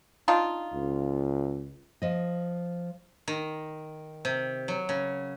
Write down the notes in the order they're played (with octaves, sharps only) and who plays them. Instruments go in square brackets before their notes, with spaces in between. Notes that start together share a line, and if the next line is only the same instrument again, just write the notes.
[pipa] D4 D#4 F4
[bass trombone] C#2
[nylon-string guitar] F3 D#5
[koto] D#3
C3
F#3
C#3